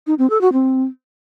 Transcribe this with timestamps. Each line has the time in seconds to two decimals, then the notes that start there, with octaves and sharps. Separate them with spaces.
0.07 D#4
0.18 C4
0.30 A4
0.41 F#4
0.53 C4